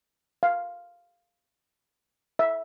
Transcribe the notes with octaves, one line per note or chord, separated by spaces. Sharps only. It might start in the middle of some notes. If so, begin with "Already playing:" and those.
F5
E5